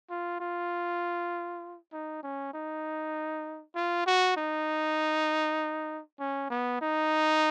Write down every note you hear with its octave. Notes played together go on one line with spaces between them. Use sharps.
F4
F4
D#4
C#4
D#4
F4
F#4
D#4
C#4
B3
D#4